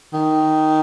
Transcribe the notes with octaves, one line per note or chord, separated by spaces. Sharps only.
D#3